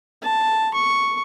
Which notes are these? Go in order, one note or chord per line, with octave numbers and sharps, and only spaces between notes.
A5
C#6